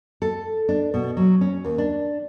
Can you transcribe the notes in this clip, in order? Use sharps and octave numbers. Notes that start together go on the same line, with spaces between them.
A4
D4
B2
F#3
C#4
D#2
D4